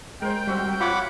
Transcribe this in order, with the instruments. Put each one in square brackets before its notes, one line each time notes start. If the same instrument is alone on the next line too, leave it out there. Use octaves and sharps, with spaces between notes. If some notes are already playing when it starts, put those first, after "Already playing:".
[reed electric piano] G#3 [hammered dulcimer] A#4 C5 [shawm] G5
[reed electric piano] G3 [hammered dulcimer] C4 F#4 E5
[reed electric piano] F4 [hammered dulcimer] F#4 C#5 [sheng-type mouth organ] F#5 B5 D6